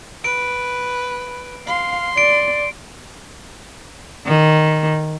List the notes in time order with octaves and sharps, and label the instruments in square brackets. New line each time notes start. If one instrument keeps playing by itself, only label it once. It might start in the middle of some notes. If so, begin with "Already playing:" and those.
[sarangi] B4 [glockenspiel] D7
[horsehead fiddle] F5 [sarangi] C6
[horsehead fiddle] D5 [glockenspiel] D7
[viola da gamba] D#3